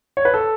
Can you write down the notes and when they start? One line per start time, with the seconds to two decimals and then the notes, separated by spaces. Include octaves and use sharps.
0.17 C#5
0.25 B4
0.34 A4